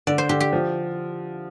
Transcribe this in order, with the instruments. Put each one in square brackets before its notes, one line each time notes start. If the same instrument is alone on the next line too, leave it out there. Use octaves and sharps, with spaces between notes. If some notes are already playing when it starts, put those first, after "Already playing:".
[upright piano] D3 [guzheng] D5
[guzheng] C5
[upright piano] D3 [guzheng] G4
[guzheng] G4
[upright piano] F3